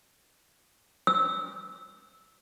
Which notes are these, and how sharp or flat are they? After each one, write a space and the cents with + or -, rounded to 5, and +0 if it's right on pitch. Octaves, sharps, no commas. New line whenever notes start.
E6 -15